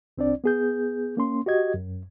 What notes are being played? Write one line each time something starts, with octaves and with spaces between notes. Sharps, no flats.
C2 C4 D4 D5
B3 G#4 G6
A#3 C#4 C6
F#4 G4 D#5 G#6
F#2